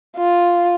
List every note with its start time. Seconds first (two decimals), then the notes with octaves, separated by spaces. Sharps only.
0.17 F4